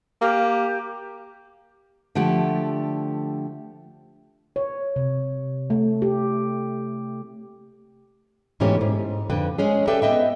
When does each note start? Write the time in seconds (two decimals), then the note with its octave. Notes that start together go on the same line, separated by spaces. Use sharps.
0.21 A#3 G4
2.15 D3 F3 A3 G4
4.56 C#5
4.96 C3
5.70 A3
6.02 G4
8.60 G#2 B2 E3 A3 C#4 G4
8.81 G#2
9.30 F2 D3 B4 G5
9.58 G#3 C#4 G#4
9.87 G4 A4 B4 D5 E5 G5
10.02 B3 D#5 E5 G5